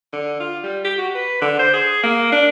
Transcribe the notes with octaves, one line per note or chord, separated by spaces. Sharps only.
D3
F4
G3
G4
F#4
B4
D3
C5
G#4
A#3
D4